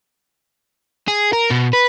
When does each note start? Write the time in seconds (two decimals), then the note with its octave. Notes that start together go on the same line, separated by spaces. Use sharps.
1.08 G#4
1.33 A#4
1.50 B2
1.73 B4